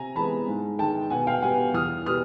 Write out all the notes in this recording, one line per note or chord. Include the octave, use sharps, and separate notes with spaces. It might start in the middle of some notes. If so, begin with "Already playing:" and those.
Already playing: C3 G#5 A#5
E3 G#3 B3 A5 B5
G#2
D#3 G#3 G5 A5
B2 F#5 G#5
F5 G5
G3 B3 F#5 G#5
E2 D#6 F6
B2 G3 D#6 F6